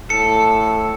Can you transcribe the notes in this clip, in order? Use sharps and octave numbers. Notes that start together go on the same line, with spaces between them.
A2 A4 C#7